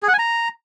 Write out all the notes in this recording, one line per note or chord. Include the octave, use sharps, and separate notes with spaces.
G#4
F#5
G#5
A#5